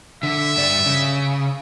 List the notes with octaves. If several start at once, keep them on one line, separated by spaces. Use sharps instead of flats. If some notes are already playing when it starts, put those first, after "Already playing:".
D3 E5
G2 D5
C#3